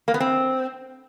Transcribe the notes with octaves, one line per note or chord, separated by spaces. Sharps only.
A#3
B3
C4